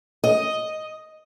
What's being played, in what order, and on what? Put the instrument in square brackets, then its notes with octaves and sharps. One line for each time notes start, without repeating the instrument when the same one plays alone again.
[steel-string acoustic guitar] D#5